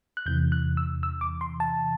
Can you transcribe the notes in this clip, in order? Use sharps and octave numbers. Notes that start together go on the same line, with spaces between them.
F#6
E2 C3 E3 G6
F#6
E6
E6
D6
C6
A5